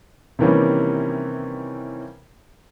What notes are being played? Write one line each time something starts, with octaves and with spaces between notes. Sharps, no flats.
C3 D#3 E3 G3 A#3 C#4